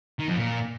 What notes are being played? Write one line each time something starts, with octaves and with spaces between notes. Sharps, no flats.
D#3
F2
A#2